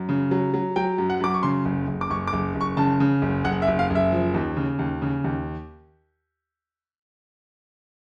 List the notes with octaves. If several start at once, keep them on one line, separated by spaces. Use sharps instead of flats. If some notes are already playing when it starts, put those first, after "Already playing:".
Already playing: F#2
C#3
F#3
F#3
F#3 G5
F#2
F#5
F#2 D6
C#6
C#3 C6
F#1
F#1
D6
F#1 C#6
D6
F#1
F#1
C#6
C#3 A5
C#3
F#1
F#1 F#5
E5
F#1
F5
F#1
E5
F3
D#2
C#3
D#2
C#3
D#2